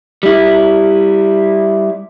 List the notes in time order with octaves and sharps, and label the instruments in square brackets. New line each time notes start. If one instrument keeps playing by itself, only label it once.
[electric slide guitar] G3 E4